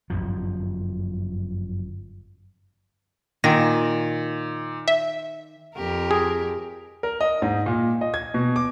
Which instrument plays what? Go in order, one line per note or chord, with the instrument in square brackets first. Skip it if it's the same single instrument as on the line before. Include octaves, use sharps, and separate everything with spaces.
[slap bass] G1 C2 F#2 F3
[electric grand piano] A#2 [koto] D#3 [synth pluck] A#6
[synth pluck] E5
[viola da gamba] F2 G4 A#4
[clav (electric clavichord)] G#4
[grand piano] A#4
D#5
G#2
A#2
D#5
G#6
B2
D6